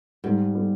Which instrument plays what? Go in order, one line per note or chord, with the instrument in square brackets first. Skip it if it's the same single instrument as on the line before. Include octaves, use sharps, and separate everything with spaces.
[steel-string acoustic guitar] G#2 [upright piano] G3
[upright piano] G3